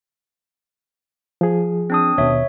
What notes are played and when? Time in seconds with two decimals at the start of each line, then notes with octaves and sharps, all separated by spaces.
1.41 F3 G#4
1.90 C4 D4 D#6
2.18 D#2 B2 C#5 E5